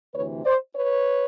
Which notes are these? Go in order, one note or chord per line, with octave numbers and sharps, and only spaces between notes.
D2 C3 E3 B4 C#5
C5 D5
B4 C#5